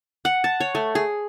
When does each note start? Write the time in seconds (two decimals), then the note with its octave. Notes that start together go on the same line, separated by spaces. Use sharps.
0.25 F#5
0.44 A5
0.60 C#5
0.75 A3
0.95 G#4